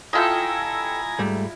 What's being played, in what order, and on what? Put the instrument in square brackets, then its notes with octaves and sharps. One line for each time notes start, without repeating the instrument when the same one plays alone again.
[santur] E4 F4 D#5 [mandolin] G4 A4 G5 [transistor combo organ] G#5 A#5
[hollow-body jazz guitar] G#2 G3 A3